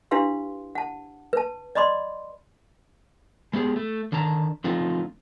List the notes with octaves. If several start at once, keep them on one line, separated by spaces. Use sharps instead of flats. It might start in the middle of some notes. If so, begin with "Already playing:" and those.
D4 E4 G4 B4 F5 C6
F#5 A5
B4 A5
D5 D#5 B5 C6 D6
G#3 B3 G4 G#4
A3
D3 D#3 D4 A5 A#5
D3 F3 A3 C4 D#4 F4